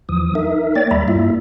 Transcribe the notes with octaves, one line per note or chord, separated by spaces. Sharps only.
E2 E3 F3 D#6
D#4 A#4 E5
A#3 C#5 D5 G5 A6
D#2 G3 D5 E5 A#5 B5
G2 A#3 E4 F4 E5